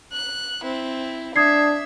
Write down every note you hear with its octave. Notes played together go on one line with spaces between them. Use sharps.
F#6
C4 E4
D4 E5 D#6 G#6 C7